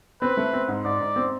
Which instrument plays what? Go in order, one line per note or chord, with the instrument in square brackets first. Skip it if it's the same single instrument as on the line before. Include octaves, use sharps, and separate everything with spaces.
[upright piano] C4 [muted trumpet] B4
[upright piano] A3
C4
G#2
[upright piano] G#2 [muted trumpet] D5
[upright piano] G#2
C4